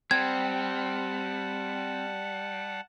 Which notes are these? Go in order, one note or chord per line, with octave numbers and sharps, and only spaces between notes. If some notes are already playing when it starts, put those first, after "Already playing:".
G3 C4 F#5 A5 G#6